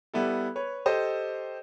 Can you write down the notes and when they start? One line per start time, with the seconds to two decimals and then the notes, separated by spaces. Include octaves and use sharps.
0.14 G3 B3 E4 A4
0.56 B4 C#5
0.86 G4 A4 C5 D#5